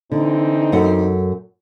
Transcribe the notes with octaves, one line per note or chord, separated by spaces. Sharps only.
D3 E3 C4 D#4
F#2 A4 F#5